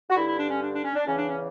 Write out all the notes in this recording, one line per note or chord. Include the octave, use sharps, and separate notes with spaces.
F#4
G2 D3 E4
E4
D4
C#4
D4
D4
C#4
D4
E2 C#3 E3 C#4
D4
C#4